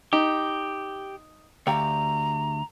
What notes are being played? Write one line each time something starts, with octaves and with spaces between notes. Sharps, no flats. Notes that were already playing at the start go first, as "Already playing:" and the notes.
D#4 G4
D2 G4 F5 A#5